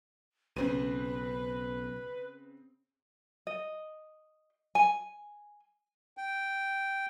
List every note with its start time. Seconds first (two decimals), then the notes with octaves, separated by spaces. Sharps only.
0.56 B1 C#3 C4 B4 D#7
3.47 D#5
4.75 G#5
6.17 G5